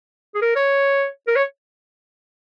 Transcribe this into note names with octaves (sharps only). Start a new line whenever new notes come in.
G#4
A#4
C#5
A#4
C#5